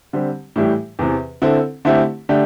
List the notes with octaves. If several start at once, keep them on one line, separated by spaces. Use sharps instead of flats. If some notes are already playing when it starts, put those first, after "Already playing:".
D3 G3 C4 G4
A2 E3 G3 E4 G4
E2 C3 E3
D3 C4 E4 A4
D3 A3 C4 E4 G4
D3 A3 D4 G4